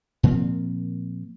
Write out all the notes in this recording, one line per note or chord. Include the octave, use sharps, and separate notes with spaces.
A#2 F3 A#3 C4